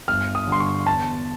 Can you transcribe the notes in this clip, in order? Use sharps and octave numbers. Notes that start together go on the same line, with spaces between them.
G1 F6
D#6
G2 D3 C6
C#6
E2 A5